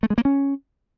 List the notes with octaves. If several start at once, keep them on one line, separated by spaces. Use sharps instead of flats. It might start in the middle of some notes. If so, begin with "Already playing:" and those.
A3
G#3
A#3
C#4